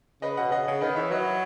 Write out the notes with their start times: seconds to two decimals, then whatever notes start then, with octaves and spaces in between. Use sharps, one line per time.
0.22 C#3 B4 D#5
0.37 B2 D#5 F#5
0.52 C#3 D#5 F#5
0.67 C#3
0.81 D#3 B4 D#5
0.96 E3 C#5 E5
1.11 F#3 B4 D#5